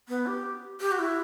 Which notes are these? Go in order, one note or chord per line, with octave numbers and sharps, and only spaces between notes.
B3
G4
G4
F#4
E4